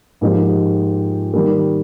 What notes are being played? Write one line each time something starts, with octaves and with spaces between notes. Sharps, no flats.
G#2 F3 A#3 D#4 G4
D#3 G3 A#3